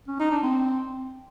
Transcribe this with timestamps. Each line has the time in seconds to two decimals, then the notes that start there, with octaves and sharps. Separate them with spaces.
0.08 C#4
0.20 D#4
0.31 D4
0.43 C4